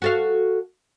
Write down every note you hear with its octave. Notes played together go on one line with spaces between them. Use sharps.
F#4 A4 F5